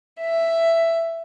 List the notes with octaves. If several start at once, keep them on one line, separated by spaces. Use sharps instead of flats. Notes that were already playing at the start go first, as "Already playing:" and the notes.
E5